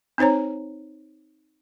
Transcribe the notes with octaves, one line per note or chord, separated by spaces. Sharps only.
C4 D#4 C5 C#5 A#5